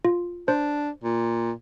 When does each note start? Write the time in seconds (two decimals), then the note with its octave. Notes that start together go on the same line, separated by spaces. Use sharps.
0.05 F4
0.48 D4 C5
1.04 A#2